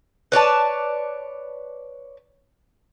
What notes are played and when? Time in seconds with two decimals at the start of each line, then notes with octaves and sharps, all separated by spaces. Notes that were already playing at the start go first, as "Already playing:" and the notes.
0.32 B4 C#5 D5 A5